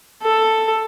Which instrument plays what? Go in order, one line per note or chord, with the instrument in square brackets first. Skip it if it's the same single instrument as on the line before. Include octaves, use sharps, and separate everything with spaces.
[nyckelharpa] A4